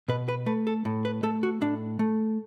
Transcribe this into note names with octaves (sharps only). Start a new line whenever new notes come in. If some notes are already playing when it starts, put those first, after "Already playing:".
B2 B4
B4
A3 B4
A4
A2
B4
A3 A4
F#4
A2 D4
A3